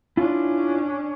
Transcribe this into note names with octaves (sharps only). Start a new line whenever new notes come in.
C#4 D4 E4 F4